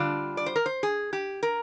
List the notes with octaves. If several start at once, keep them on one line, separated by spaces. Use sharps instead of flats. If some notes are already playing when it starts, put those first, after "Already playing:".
Already playing: D3 G3 D4 F4 D5
D5
C5
A#4
C5
G#4
G4
A#4